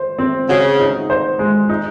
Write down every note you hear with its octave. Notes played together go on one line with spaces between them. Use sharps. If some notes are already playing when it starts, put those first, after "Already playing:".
Already playing: C5
C4
C#3 F#4
D#4
C5
G#3
D#4